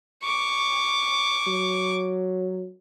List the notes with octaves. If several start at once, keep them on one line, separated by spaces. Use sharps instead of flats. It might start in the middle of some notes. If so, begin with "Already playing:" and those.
C#6 D6
F#3